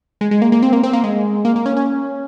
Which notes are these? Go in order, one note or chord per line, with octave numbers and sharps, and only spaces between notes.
G#3
G#3
A#3
A#3
C4
A#3
C4
A#3
G#3
A#3
A#3
C#4
C#4